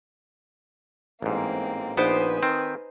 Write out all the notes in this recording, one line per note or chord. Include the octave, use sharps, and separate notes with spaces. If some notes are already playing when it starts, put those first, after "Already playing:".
A1 G#2 A#3 C4
A#1 B3 D#4 B4 C5 G#5 D6
D#3 C4